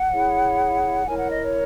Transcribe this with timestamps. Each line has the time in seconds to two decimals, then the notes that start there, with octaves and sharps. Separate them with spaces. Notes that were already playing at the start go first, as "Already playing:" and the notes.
Already playing: F#5
0.10 E4 G#4 C#5
1.05 E4 A#4 C#5 G#5
1.17 F#5
1.29 D#5
1.41 C#5